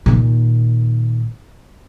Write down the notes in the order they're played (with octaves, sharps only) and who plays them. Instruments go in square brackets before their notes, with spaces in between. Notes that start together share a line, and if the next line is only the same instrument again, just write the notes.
[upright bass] A#2 D#3